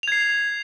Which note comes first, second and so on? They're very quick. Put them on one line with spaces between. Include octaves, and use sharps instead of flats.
F7 G#6 C7